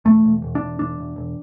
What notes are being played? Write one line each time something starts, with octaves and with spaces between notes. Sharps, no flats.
E1 A3
E1
E1
D4
E1
E1 D4
E1
E1